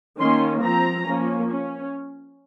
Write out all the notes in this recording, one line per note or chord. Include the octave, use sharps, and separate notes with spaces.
D#3 A#3 C#4 C6
F3 C4 A#5
F3 A#3 C#4
C#4